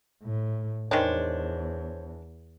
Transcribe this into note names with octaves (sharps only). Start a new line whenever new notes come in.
A2
E2 D#3 G#3 D4 C5 C#5